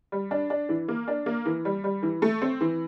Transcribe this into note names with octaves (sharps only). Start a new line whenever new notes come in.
G3
D4
D4
E3
A#3
D4
A#3
E3
G3
G3
E3
A3
C4
E3